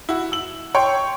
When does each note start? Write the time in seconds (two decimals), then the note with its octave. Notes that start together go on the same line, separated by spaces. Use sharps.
0.09 E4 F#4
0.32 E6 F#7
0.75 C#5 G5 C6 C#6